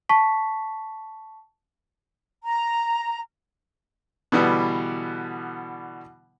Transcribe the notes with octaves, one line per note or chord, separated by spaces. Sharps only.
A5 C#6 B6
A#5
B2 D3 E3 G3 B3